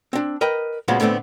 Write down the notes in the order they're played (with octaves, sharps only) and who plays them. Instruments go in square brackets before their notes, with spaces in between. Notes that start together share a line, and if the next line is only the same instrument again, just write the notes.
[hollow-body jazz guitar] C4 D4
A#4 B4 D#5 G5
A#2 C#3 F3 F#3 G#3 B3
A2 D3 A3 B3 C4